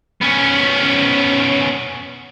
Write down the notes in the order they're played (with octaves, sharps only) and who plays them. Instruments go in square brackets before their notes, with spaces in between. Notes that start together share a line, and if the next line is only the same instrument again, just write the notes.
[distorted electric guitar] B3 C#4